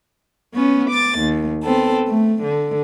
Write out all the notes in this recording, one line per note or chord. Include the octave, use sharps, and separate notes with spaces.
B3 C#4
D6 A6
D#2
B3 C4 A4
A3
D3